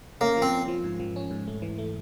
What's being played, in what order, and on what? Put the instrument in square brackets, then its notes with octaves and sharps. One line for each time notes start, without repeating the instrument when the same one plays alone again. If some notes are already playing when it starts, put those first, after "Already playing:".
[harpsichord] A#3 [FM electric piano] C#4
[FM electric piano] F3
[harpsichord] C4
[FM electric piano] A#3
F3
G#2
F3
C#4
G#2
A3
E3
A3